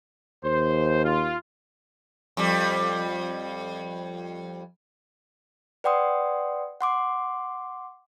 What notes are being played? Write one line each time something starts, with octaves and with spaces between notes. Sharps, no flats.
D#2 C5
F4
F2 G3
B4 D5 F#5 G5 C6 D#6
F#5 C6 D6